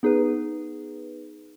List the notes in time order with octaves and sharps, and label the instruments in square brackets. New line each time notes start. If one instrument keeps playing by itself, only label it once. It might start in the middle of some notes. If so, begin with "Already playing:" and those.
[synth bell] B3 D#4 G#4 B4